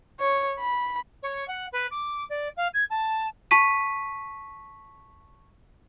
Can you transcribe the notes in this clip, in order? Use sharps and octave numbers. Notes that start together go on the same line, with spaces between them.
C#5
B5
C#5
F#5
B4
D6
D5
F5
G#6
A5
A5 C#6 B6 D#7